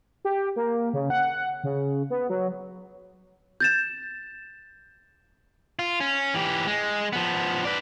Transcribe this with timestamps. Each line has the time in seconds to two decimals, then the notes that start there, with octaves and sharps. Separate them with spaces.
0.25 G4
0.56 A#3
0.93 C#3
1.10 F#5
1.64 C#3
2.10 B3
2.30 F#3
3.60 G6 A6 E7
5.79 F4
6.00 C#4
6.34 E3 G4
6.67 G#3
7.13 F3 B3
7.65 B4 D5